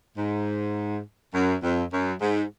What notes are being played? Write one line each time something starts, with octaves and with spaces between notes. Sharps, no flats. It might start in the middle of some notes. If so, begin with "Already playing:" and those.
G#2
F#2
F2
F#2
G#2